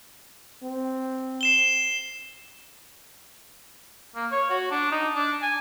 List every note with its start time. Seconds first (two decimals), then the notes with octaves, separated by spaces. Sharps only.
0.63 C4
1.41 C7 E7 G7
4.15 A#3
4.32 C#5
4.50 F#4
4.71 D4
4.92 D#4
5.15 D4
5.42 G#5